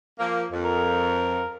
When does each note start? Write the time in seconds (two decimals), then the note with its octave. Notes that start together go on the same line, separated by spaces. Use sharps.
0.19 F3 A#3
0.51 F2
0.64 A#4